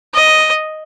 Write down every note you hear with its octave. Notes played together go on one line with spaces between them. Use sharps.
D#5